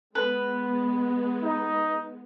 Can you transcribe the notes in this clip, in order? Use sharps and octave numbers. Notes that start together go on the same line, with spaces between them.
G#3 B3 B4
D#4